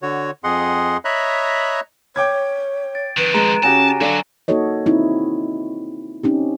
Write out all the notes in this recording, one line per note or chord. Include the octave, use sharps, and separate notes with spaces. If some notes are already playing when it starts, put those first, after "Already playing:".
D3 F#4 C#5
F2 G#4 D#5 F#5 C6
C#5 D#5 E5 A#5 B5 F#6
C#5 G5 D6 G#6
A6 D7
F2 D#3 B4 F#6 D7 D#7
G#3 A#5 E7
C#3 C#4 F#4 G4 G#5 A5 A#6
D3 F#3 D5 F5
A#3 D#4 F#4 A4 C#5 D#5
C4 D#4 E4
C4 C#4 D#4 G4